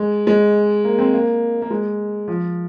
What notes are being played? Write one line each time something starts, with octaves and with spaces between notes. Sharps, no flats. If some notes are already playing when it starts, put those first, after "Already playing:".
Already playing: G#3
G#3
A#3
C4
A#3
A#3
G#3
F3